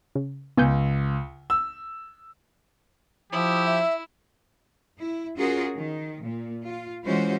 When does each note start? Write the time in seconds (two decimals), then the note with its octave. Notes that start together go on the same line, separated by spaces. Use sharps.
0.15 C#3
0.57 C#2 B3 G#5 G6
1.50 E6
3.32 F3 E4 G4 D#6
3.65 E5
5.00 E4
5.37 C#4 F4 F#4 G#4 A#4
5.75 D#3
6.24 A#2
6.64 F4
7.05 E3 G#3 C#4 F4 F#4 C5